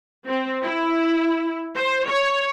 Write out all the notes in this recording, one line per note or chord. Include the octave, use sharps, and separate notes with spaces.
C4
E4
C5
C#5